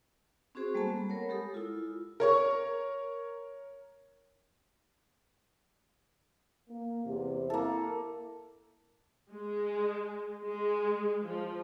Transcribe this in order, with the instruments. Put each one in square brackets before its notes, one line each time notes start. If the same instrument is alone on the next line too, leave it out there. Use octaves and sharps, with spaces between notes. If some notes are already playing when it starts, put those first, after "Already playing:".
[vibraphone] C4 C#4 F#4 G#4 C5
G3 G#3 A#3 B3 A4 A5
G3 C4
A#4 C#5 F#5 B5
G#3 G4 A4 D#6
E4 F4
[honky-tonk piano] A#4 C#5 C#6
[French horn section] A#3
E2 C3
[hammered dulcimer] A#3 A4 [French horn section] E4
[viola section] G#3
G#3
F3